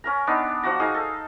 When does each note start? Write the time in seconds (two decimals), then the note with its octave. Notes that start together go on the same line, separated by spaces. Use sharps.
0.04 C#4 A#4 A#5
0.27 B3 D4 D#4
0.63 F3 F#4 A#5
0.80 D#4 G#4 F5
0.94 A4